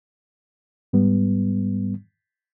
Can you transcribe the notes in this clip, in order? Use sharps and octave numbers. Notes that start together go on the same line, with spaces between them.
G#2 G3 B3